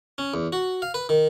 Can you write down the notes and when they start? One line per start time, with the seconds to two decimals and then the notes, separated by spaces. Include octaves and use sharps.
0.18 C#4
0.34 E2
0.53 F#4
0.82 F5
0.94 B4
1.09 D#3